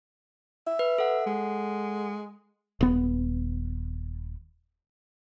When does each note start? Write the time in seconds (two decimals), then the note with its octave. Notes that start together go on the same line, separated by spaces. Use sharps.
0.67 E5
0.79 B4
0.98 A4 F#5
1.26 G#3
2.81 D#1 B3